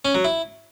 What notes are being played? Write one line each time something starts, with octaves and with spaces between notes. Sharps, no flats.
C#4
F#3
E4